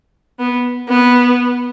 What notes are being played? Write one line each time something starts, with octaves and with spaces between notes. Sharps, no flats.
B3
B3